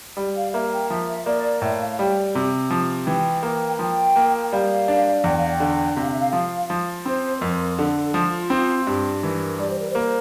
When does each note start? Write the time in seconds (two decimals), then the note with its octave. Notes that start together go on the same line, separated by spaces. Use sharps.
0.17 G3
0.35 F5
0.53 A#3 E5
0.72 G5
0.90 F3 E5
1.26 A#3 D5
1.62 A2 E5
1.75 E5
1.81 F5
1.99 G3 G5
2.35 C3
2.70 F3
3.07 E3 G5
3.43 A#3
3.79 F3 G5
4.16 A#3
4.51 G3 F5
4.88 D4
5.24 E2 G5
5.37 F5
5.49 G5
5.60 D3
5.97 C3 F5
6.09 E5
6.20 F5
6.33 F3 F5
6.70 F3
7.06 C4 C5
7.36 C5
7.41 F2 A#4
7.79 D3 A4
8.14 F3 F4
8.50 C4
8.87 G2 G4
9.23 E3 A#4
9.59 G3 D5
9.69 C5
9.80 A#4
9.90 C5
9.95 A#3